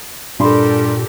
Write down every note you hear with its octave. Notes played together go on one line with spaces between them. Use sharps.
G2 A#2 G4 A4 A#4 B5 C6